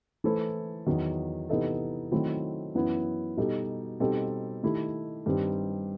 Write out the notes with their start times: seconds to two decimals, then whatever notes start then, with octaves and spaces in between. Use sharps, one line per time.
0.24 E3 A3 E4 A4 C5
0.87 E2 D#3 F#3
1.49 C3 E3 B3 D#4 A4
2.12 D#3 F#3 A3 C4 E4
2.75 F#2 E3 B3 E4
3.37 B2 G3 D#4 F#4 A4
4.00 B2 G3 C4 D#4 A4
4.63 D#3 A3 E4 G4
5.26 G2 D#3 G3 C4